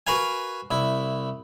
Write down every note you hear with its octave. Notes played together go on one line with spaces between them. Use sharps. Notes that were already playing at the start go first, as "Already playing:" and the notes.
F#4 A#4 B4 F5 G#5
C2 E4